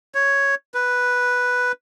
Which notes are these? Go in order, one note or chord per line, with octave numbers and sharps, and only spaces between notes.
C#5
B4